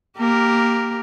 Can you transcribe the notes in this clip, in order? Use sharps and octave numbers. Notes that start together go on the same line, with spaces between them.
A#3 G4 A#4